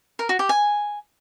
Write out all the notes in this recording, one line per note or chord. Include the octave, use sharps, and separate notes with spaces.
A#4
F#4
G4
G#5